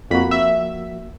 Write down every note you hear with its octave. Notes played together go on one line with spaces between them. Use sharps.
F2 F3 A#3 F#4 B5
E5